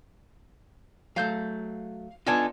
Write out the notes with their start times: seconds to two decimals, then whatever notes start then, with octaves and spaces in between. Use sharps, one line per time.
1.16 F#3 A3 F5 G6
2.27 B3 D4 D#4 F4 A4 G#5